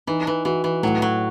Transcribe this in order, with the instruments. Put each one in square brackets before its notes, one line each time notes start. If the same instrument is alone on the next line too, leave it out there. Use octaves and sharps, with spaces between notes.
[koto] E3 [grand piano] D#4
[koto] E3
[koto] E3 [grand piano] F#4
[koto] E3
[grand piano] A2 [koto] F#3
[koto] F#3